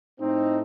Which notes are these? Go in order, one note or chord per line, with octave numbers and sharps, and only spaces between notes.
A2 A3 C4 D#4